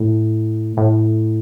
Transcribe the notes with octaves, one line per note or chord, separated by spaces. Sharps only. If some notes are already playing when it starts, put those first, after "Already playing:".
Already playing: A2
A2